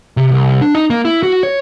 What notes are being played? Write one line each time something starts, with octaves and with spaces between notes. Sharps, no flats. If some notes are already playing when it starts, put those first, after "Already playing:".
C3
C2
D4
D#4
A#3
E4
F#4
C#5